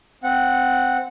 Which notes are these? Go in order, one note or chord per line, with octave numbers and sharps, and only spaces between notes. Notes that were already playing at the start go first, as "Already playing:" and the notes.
C4 F#5